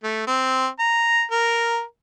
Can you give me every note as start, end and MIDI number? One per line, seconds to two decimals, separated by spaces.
0.04 0.23 57
0.27 0.68 60
0.79 1.25 82
1.32 1.83 70